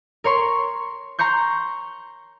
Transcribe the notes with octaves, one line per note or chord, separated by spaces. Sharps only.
A#4 C#5 C6 C#6
A#5 C6 C#6 G6